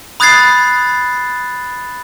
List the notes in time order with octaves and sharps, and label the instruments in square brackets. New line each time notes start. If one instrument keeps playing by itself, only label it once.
[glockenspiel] B5 D#6 F#6 G#6 A6 C7